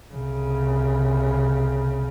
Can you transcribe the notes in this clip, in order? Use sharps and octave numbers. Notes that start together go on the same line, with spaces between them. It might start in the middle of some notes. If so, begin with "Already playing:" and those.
C2 C#3